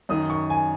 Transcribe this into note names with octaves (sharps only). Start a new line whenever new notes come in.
F#2 D#3 D#6
C#6
G#5